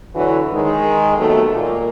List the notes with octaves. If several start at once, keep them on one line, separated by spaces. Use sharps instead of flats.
D3 E3 F#3 F#4 C#5
D#3 G#3
D#2 B2 F#3 A3
A#2 A#3